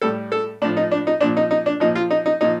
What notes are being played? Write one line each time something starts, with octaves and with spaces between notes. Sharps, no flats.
A2 G3 A4
A4
A2 F3 D4
D#4
D4
D#4
A#2 F3 D4
D#4
D#4
D4
A#2 F3 D#4
F4
D#4
D#4
A#2 F3 D#4